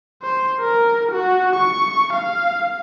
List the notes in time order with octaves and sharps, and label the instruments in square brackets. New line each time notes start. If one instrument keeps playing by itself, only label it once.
[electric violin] C5
A#4
F#4
C#6
F5